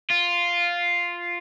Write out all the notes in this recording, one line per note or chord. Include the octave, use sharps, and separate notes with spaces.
F4